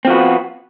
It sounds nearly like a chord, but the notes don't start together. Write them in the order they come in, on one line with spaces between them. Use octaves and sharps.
C4 F3 F#4 B3